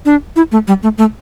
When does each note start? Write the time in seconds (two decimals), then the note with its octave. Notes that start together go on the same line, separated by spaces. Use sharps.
0.06 D4
0.36 E4
0.52 A3
0.68 G3
0.83 A3
0.98 A3